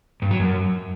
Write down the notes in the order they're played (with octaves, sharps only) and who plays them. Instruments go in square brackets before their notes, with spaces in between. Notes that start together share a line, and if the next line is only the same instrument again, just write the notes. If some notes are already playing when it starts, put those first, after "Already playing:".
[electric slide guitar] G2
F#3
F#2